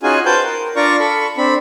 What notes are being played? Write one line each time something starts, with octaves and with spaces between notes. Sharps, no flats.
C#4 D#4 F4 F#4 G#4 G#5
F#4 B4 C5 G5 A5 G6
A#4
D4 F4 D5 A#5 C#6
A4 B5 C#6
C4 D4 B5